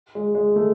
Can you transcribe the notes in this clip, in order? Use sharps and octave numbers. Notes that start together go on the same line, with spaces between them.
G#3
G#3
A3